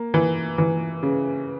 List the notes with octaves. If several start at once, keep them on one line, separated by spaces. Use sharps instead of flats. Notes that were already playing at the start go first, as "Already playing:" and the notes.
Already playing: A#3
E3
E3
C#3